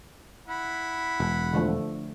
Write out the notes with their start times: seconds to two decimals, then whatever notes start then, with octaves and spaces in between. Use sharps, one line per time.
0.48 E4 F#5 B5
1.20 E1
1.53 D3 F3 A3